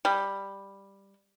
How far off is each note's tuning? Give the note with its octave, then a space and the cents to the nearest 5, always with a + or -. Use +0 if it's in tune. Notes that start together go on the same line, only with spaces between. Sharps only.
G3 +5